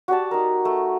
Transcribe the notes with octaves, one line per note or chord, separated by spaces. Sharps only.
F#4 G4 D5 A5
D#4 A#4
A3